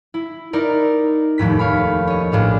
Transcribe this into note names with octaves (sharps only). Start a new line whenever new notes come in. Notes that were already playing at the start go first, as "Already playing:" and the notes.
E4
D#4 E4 A#4 D5
F1 D#2 A2 B6
C#5 F5 B5
C#5 D#5
A#1 A2 D4 F5